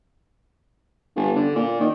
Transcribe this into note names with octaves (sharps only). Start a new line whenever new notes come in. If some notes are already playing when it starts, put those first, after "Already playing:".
G1
D3
A#2
D#3